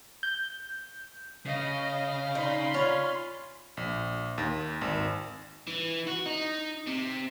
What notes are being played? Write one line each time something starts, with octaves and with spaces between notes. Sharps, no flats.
G6
C#3 D#5 F5
D#4 B5 C6
C#4 F4
A#1
D#2
G#1
E3
F#4
D#4
C3